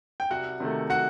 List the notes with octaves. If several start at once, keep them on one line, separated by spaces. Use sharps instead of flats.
G5
C2 F#4 F#5
C3 D#3 A3
F#4 F#5